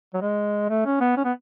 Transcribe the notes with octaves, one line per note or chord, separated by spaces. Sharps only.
F#3
G#3
A3
C#4
B3
C#4
B3